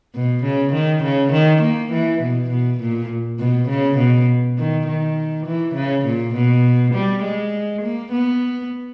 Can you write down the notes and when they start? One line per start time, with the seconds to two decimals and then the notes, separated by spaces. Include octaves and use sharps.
0.15 B2
0.44 C#3
0.73 D#3
1.03 C#3
1.32 D#3
1.62 A#3
1.92 E3
2.21 B2
2.50 B2
2.80 A#2
3.39 B2
3.69 C#3
3.98 B2
4.58 D#3
4.87 D#3
5.46 E3
5.75 C#3
6.06 A#2
6.34 B2
6.94 G3
7.23 G#3
7.82 A#3
8.12 B3